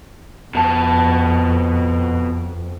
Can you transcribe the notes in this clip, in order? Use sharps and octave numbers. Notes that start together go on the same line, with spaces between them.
F2 B2 A5